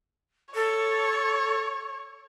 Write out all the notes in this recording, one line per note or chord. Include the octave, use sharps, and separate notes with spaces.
A4 C#5